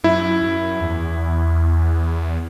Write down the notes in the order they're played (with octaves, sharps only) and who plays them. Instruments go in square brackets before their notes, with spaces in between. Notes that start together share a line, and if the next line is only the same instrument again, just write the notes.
[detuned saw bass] F#2 [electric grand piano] E4
[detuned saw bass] F#2
E2